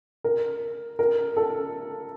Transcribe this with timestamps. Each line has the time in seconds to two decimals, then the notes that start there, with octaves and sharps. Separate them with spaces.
0.24 A#4
0.99 A#4
1.37 A4